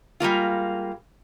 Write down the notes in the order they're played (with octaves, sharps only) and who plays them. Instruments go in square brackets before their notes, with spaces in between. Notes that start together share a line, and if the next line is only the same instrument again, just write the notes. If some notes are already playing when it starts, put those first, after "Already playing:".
[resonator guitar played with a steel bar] G3 G#3 A#3 F4